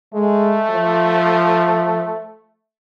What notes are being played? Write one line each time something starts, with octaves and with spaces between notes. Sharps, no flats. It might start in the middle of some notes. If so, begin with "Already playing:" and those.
G#3 A3
F3